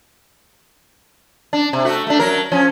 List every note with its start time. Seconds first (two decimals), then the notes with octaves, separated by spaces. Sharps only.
1.53 D4
1.73 C3
1.85 A3 F#4
2.07 A3 D4
2.19 F#3 A#4
2.52 F3 C#4